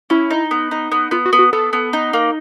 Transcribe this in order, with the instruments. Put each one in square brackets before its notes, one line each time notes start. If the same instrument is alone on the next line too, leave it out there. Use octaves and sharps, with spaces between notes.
[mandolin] C#4 [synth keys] E4
[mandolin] D#4
B3
D#4
B3
[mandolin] B3 [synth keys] F4
[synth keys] F#4
[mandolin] B3
[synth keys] F#4
[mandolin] B3 [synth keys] A4
[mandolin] B3
D#4
A#3